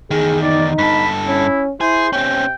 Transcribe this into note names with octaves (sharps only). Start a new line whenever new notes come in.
E2 D#3 G#4
D#4 D5
G2 A4 B5
C#4 E4
E4 G#4 C5
C3 C4 C#4 G5